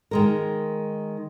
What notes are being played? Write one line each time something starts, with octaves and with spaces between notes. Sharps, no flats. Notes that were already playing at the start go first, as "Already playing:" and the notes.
D#3 G#3 A#4